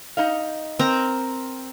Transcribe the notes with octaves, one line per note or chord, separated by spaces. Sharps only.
D#4 D#5 F5
C4 A#4 A#5